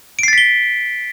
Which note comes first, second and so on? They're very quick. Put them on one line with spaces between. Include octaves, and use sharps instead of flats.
D7 C7 A6 B6 G7